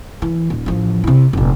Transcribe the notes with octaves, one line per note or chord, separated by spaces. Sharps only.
E3
D#1
A1 F3
C3 E4
F1 A#1